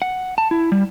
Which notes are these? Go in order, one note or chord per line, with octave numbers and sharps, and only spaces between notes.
F#5
A5
E4
G3